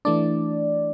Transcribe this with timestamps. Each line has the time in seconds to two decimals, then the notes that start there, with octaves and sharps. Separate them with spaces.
0.05 E3 A3 D4 D5